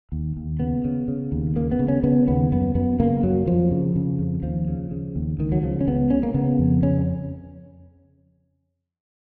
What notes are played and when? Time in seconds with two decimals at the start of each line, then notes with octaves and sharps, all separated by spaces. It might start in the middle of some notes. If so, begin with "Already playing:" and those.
0.12 D#2
0.37 D#2
0.59 C#3 B3
0.84 C#3
1.08 C#3
1.32 D#2
1.56 C#3 A#3
1.72 B3
1.79 C#3
1.88 C#4
2.03 C#3 B3
2.28 D#2 B3
2.52 F#2 B3
2.75 F#2 B3
3.00 C#3 A#3
3.23 F#2 F#3
3.47 F2 F3
3.71 C#3
3.96 C#3
4.19 F2
4.43 D#2 F3
4.68 C#3
4.91 C#3
5.16 D#2
5.39 C#2 D#3
5.52 F#3
5.63 C#3 F3
5.81 C#4
5.87 C#2 B3
6.10 C#3 C#4
6.23 A#3
6.34 C#3 B3
6.59 F2
6.83 C#3 C#4